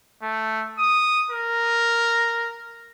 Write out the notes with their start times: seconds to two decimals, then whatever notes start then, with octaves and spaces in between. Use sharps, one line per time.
0.22 A3
0.78 D#6
1.31 A#4